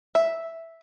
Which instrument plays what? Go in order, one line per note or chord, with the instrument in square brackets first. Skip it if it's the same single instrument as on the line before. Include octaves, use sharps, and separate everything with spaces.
[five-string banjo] E5